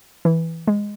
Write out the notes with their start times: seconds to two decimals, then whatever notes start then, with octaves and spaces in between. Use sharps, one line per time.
0.25 E3
0.67 G#3